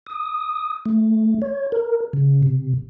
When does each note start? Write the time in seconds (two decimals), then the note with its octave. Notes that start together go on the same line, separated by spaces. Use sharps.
0.06 D#6
0.86 A3
1.42 C#5
1.72 A#4
2.13 C#3
2.43 C3